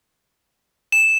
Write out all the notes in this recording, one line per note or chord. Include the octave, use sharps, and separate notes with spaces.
E7